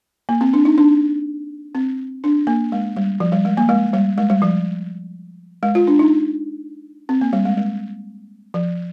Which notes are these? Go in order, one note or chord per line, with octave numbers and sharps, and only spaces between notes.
A#3
C4
D4
D#4
D4
C4
D4
A#3
G#3
G3
F3
G3
G#3
A#3
G#3
G3
G#3
G3
F3
G#3
F4
D4
D#4
C4
A#3
G3
G#3
G#3
F3